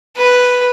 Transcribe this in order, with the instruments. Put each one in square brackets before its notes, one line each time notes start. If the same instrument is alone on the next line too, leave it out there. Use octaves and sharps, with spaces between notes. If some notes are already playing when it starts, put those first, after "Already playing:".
[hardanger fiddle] B4